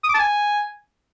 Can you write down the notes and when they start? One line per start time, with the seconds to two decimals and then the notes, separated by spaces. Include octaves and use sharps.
0.04 D#6
0.09 D6
0.14 A5
0.19 G#5